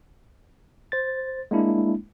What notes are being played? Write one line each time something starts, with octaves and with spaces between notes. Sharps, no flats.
C5 A6
G#3 A#3 D4 E4